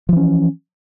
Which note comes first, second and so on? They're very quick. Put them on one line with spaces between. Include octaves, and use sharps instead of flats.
F3 E3 C#4